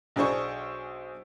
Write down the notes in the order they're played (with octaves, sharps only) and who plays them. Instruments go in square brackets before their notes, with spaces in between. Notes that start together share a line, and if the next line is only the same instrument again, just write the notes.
[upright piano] B1 D4 G#4 C5 C#6